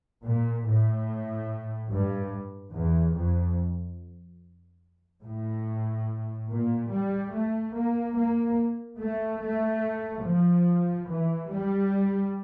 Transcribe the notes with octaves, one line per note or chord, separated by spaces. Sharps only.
A#2
A2
G2
E2
F2
A2
A#2
G3
A3
A#3
A#3
A3
A3
F3
E3
G3